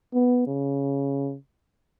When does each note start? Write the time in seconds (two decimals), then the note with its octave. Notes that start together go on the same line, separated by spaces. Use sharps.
0.14 B3
0.47 C#3